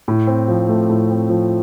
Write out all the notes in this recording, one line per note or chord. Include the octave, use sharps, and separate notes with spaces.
A2
C4
F3
A3
A2
C4
F3